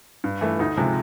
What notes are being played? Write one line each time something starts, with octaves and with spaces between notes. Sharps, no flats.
G2
E3 A3
D2 D#4
C3 F3 G#3